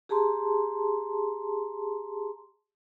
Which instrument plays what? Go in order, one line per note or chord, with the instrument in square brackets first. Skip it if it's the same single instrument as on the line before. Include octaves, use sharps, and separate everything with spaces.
[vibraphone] G4 G#4 A5 A#5 C6